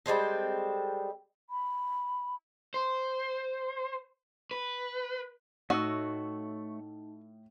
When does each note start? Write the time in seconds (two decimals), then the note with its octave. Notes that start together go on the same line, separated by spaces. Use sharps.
0.06 G3 G#3 C4 A4
1.50 B5
2.74 C5
4.51 B4
5.70 A2 A3 D#4 F#4 C#5 D#5 E6